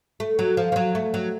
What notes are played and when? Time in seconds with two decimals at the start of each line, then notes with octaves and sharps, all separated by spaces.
0.20 A3
0.39 F#3
0.57 F3
0.72 F3
0.76 F#3
0.95 A3
1.14 F#3